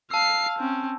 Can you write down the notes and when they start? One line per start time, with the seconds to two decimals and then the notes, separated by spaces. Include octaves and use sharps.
0.11 F5 A5 E6 C7
0.59 C4 C#4